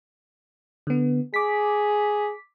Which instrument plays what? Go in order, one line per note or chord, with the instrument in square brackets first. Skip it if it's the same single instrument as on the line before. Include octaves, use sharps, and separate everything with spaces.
[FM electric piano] D3 B3
[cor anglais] G#4 [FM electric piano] D6 B6